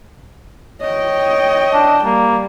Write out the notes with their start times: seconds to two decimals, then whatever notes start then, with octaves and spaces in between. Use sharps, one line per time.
0.81 C#5 D#5 G5
1.73 D4
2.05 G3 A#3